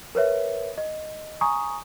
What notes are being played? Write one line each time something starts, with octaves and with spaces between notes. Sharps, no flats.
A#4 B4 C#5 E5
D#5
G#5 A#5 C#6 D#6